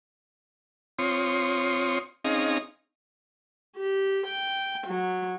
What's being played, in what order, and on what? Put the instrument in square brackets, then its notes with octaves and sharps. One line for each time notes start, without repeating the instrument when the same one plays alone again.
[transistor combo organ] C4 F4 C#5 C6 D#6
C4 C#4 D#4 G#4 D#5 F5
[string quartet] G4
G5
F#3